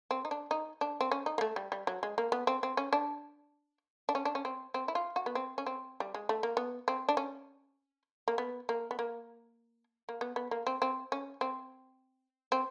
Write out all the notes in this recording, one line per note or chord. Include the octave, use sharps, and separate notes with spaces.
C4
D#4
D4
D#4
D4
C4
C#4
D#4
A#3
A3
G3
G3
F#3
G#3
A#3
B3
C4
C4
C#4
D4
D4
C#4
D4
C#4
C4
C4
E4
F4
F#4
B3
C4
C#4
C4
G3
G#3
A3
A#3
B3
C4
D4
C#4
A#3
B3
A#3
B3
A#3
A#3
B3
B3
A#3
C4
C4
C#4
C4
C4